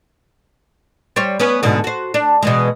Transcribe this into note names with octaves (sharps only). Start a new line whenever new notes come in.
G3 C5 C#5
B3 C#4 B4
G#2 B2 D3
F#4 C5
D4
B2 E3 G#3